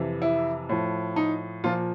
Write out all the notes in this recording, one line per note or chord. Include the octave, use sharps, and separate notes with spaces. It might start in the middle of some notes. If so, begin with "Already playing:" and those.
Already playing: F2 C3 E3
E4
A2 F3
D#4
A#2 F3 F4